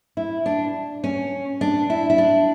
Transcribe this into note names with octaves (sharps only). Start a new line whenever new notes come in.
E4
D4
C#4
D4
E4
E4
D4